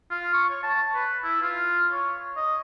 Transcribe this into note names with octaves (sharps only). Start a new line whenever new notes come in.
F4
C#6
C#5
A5
B4
E4
F4
C#5
D#5